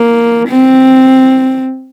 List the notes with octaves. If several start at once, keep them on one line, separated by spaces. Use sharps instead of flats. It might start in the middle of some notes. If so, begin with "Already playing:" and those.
Already playing: A#3
C4